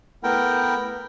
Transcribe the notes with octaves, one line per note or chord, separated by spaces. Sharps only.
A3 B3 E4 A#4 G5